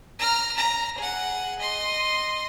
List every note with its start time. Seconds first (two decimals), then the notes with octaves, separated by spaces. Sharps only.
0.19 A#5 F6
0.57 A#5
0.97 G#4 F#5
1.58 D#5 C6